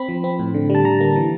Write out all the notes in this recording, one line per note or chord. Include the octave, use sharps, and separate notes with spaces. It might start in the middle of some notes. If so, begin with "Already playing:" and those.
Already playing: C4 B5
F3
C4
A2
D3
G3
A5
D3 A#5
A#3
E3